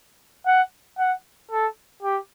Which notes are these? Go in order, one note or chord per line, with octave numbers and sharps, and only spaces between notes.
F#5
F#5
A4
G4